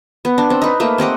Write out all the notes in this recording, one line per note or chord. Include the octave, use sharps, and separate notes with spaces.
B3
D4
C4
D#4 B4
A3 A#3 B4
C4 G4 D#5 F#5